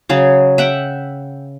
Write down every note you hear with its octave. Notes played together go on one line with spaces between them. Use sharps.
C#3 F#3 G#4
E5 F#5 G5